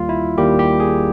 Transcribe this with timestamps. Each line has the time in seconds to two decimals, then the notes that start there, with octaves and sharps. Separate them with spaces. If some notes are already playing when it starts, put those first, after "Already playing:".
Already playing: D#2 D#3 G3 A#3 F4
0.09 E4
0.37 D#2 D#3 G3 A#3 G4
0.59 G4
0.80 G#4